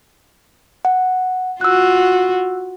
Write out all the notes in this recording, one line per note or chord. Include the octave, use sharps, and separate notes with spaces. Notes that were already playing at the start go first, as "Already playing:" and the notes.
F#5
F4 F#4 E6 F#6